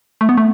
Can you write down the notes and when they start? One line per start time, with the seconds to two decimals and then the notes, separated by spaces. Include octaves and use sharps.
0.21 A3
0.29 B3
0.37 A3